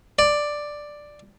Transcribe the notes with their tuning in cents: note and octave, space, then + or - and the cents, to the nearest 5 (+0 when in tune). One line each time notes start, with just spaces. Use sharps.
D5 +5